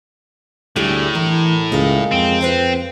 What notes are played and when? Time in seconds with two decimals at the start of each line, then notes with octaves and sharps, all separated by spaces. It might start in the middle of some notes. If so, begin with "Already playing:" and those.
0.76 D2 A2 G3 E4 G#4
1.15 E3 A#4
1.72 C#2 G#3 A#4 F5
2.11 F2 C4
2.41 B4 C5 G5